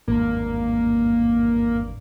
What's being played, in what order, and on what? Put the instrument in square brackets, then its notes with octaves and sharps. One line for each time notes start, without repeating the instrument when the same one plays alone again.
[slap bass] G#1 E2 G2 [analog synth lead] A#3